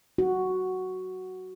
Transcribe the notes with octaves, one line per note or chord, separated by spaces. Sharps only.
F#4